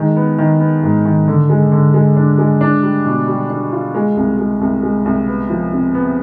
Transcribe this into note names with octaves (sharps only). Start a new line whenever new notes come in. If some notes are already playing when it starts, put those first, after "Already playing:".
Already playing: D#3 G#3
B3
D#3
B3
G#2
D#3
D3
G#3
D3
G#3
D4
G#3
D4
G3
B2
G3
D4
F4
G#3
C2
G#3
C2
G#3
C2
B3
F3
C3
B3